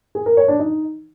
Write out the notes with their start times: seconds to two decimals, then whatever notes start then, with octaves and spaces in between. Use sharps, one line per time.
0.15 G#4
0.26 A#4
0.37 C#5
0.48 D4
0.59 D#4